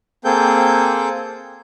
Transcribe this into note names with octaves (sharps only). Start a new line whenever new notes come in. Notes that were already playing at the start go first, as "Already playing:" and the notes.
A#3 C4 G#4 A4 G5 G6